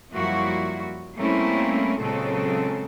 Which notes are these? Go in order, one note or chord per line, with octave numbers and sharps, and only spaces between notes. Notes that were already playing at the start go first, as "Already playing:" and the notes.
F#2 F3 G3 A#3 E4 F#4
G3 A3 A#3 C4 C#4 E4
A#2 C#3 F#3 G#3 C4 A4